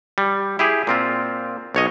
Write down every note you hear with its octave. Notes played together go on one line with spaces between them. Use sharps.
G3
E4 G4 G#4
A#2 C4 F4
B1 C#5 D#5